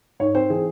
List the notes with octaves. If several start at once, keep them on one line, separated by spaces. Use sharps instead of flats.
G#2 C#5
C4 C5
E3 G#4